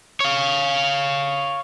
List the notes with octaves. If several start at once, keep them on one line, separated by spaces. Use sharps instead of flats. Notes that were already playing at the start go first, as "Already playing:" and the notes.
C#5 F5